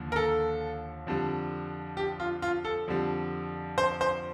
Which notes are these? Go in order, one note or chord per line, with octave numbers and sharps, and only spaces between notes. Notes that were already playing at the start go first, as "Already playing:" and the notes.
Already playing: D#2 D3 F3
A#4
A4
F2 D3 G3
G4
F4
F4
A4
F2 D3 G3
C5
C5